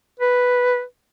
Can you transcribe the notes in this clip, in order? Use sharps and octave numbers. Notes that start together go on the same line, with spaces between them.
B4